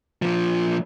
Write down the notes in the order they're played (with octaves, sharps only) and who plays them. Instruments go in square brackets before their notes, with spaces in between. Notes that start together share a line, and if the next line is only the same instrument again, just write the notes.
[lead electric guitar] A#2 F3